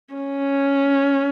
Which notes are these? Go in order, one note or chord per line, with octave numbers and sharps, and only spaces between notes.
C#4